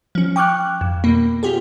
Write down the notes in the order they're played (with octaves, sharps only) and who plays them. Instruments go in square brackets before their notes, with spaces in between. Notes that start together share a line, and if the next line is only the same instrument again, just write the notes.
[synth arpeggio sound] F3 C#4
G5 C#6 D6 F6 F#6
F2
B2 A#3
B3 F4 G4 G#4